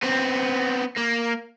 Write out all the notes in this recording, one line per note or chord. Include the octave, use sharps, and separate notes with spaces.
B3 C4
A#3